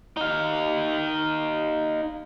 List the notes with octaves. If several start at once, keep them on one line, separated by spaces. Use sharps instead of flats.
D#4 F5